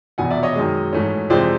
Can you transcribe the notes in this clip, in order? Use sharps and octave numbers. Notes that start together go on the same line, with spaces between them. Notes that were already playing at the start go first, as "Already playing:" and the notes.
F1 E2 B2 F#5 G#5
D5 E5
C#5 D#5
F#2 D#3 G#3
G#2 E3 A3 C#4
F2 C3 E3 G#3 C5 D5